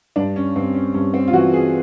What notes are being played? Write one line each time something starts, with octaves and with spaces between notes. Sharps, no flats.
G2 D4
C#4
G2 C4
C#4
G2 C#4
C4
F4
E3 F#4
G#4